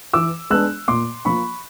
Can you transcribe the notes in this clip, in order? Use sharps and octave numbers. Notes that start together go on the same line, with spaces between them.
E3 D6 E6
G#3 B3 D4 E6 F#6
A#2 C6 D6
F3 A#3 B5 C#6